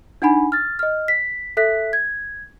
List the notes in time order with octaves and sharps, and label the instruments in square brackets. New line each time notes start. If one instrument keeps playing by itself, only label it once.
[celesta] D4 D#4 F#5 G#5 B5
F6 A6
D#5 F6
B6
A4 E5 F#6 B6
G#6